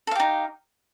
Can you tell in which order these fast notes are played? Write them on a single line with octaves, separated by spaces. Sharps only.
A4 F5 G4 D#4